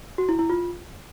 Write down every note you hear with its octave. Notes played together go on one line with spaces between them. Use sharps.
F#4
E4
E4
F4